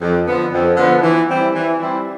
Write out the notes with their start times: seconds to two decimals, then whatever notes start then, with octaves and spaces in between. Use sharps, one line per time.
0.01 F2
0.27 D3 F3 B3
0.52 F2
0.77 D3 F3 B3
1.02 E3
1.28 G3 C4 E4
1.54 E3
1.80 G3 C4 E4